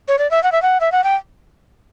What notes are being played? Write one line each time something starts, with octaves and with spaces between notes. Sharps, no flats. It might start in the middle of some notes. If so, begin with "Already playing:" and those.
C#5
D5
E5
F#5
E5
F#5
E5
F#5
G5